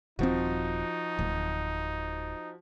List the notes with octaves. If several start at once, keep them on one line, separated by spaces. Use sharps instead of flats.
D#1 F3 C4 D#4 F#4
D1